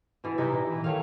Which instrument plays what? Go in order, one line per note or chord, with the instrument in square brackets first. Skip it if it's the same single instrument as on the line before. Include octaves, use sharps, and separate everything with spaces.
[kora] B2 E3
[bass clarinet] C3 [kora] D#4 E4 G4
[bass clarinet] A#2 [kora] E4
[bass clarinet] E3
[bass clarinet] D#3 [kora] A3 C#5 F5